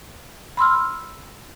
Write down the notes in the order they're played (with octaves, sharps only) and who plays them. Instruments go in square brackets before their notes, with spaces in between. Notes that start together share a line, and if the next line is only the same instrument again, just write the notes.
[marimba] B5 C6 E6 F6